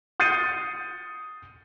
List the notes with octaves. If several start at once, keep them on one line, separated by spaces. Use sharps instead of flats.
D#6 G6 A6 C7 C#7 D#7